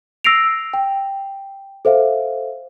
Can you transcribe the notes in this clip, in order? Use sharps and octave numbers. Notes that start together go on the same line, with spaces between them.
E6 A#6 C7 D7 F7
G5
A4 C5 E5 F5